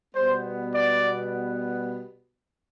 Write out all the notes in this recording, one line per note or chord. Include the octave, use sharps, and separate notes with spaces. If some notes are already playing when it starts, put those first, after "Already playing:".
B2 G3 B3 C5
D5